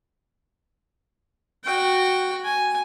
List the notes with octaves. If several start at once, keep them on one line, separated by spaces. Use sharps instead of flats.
F#4 G5
G#5